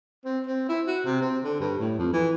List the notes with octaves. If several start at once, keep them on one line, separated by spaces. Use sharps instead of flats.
C4
C4
E4
F#4
C3
C4
D3
G2
A2
F2
E3